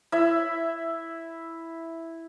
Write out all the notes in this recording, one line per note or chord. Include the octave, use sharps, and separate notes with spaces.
E4 E5